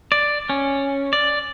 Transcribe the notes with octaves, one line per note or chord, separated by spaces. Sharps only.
D5
C#4
D5